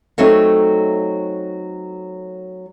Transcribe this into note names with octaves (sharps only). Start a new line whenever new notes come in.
F#3 A3 C4 D#4